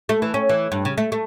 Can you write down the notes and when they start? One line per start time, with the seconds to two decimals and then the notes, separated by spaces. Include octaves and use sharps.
0.09 A3
0.22 E3
0.34 C#4
0.49 E3
0.72 G2
0.85 C#3
0.98 A3
1.12 A3